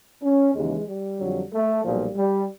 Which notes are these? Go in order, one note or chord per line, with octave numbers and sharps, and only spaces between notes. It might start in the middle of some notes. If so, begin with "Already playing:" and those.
C#4
D#2 C#3 E3 G#3
G3
F2 D3 F#3
A3
B1 A#2 F3 G3
G3